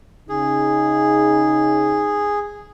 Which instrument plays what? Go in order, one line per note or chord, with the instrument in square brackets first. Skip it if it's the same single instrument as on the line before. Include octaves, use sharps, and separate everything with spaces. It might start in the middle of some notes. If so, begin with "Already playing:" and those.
[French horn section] C#3 D#4 [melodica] G#4